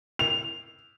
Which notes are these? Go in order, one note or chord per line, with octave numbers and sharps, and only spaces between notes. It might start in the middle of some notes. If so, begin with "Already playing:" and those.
F7